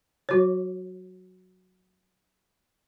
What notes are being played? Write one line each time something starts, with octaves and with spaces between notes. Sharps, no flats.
F#3 F#4 C#5